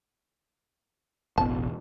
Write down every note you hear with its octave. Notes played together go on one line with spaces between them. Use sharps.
E1 A1 B2 A5